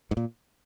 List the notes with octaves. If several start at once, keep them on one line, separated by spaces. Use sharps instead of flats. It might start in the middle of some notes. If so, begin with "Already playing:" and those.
G#2
A#2